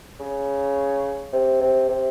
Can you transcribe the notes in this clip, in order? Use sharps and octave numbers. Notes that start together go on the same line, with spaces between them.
C#3
C3
C3
C3